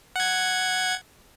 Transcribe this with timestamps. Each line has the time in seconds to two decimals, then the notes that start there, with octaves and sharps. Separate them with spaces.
0.16 F#5 G#6